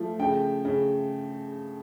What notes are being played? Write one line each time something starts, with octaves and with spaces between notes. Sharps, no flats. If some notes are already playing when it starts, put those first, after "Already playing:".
Already playing: F3 A3
C#3 G5
C#3